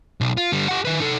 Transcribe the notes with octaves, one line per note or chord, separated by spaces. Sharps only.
B1
F4
D3 G3
G4 F#5
D#3 B4
D#4 A4